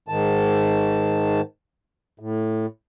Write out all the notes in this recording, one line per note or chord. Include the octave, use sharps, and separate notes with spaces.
G#2 D#3 A5
A2